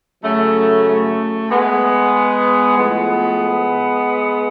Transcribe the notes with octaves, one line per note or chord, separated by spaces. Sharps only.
C#3 F#3 A3
A3
G#3 B3
A2 F3 G#3 B3